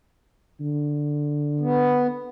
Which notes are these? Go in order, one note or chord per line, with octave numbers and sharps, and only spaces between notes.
D3
B3